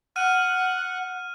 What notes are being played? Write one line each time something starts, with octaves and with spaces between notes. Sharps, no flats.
F#5 F6 D#7